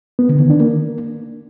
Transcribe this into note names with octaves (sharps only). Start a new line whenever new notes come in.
B3
D3
D#3
D4
A#3